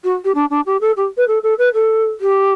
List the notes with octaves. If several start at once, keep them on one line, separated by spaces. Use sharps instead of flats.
F#4
G4
D4
D4
G4
A4
G4
B4
A4
A4
B4
A4
G4